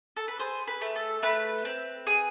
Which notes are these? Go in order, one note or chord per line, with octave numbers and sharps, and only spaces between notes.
A4
B4
G#4 C5
B4
A3
A4
A3 B4
C4
G#4